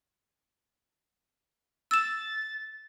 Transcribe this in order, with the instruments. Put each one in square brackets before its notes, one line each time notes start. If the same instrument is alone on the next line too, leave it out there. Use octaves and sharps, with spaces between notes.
[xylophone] E6 E7 [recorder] A6